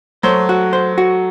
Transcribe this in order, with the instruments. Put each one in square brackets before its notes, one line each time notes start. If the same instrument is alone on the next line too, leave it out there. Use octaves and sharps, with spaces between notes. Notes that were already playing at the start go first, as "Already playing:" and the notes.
[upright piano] F#3 A3 [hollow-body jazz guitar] C5
[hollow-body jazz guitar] F#4
C5
F#4